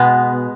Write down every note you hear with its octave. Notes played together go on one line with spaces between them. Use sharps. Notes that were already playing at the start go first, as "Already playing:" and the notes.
Already playing: B2 G#3 B3